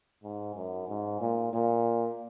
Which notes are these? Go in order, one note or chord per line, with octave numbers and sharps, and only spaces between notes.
G#2
F#2
G#2
A#2
A#2